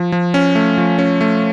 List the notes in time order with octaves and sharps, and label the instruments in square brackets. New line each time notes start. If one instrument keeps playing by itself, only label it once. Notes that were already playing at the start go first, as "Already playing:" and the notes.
Already playing: [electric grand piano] F3
F3
C#4
A3
F3
C#4
A3